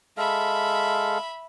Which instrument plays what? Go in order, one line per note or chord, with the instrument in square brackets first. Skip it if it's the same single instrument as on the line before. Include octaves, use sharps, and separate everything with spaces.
[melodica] G#3 A4 F5 [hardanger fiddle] E5 B5